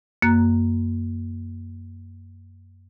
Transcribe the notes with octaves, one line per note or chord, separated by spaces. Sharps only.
F#2 A#3 F#6